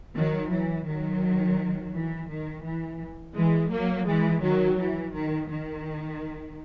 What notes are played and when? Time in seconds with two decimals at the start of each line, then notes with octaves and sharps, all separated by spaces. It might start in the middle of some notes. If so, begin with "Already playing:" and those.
0.15 D#3 F#3
0.51 E3
0.86 D#3 F#3
1.93 E3
2.29 D#3
2.64 E3
3.35 E3 G#3
3.71 F#3 A#3
4.07 E3 G#3
4.42 D#3 F#3
4.78 E3
5.14 D#3
5.49 D#3